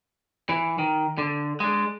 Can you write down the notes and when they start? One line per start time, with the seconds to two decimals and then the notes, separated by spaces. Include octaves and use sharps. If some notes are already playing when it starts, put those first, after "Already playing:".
0.49 E3
0.78 D#3
1.18 D3
1.60 G#3 D4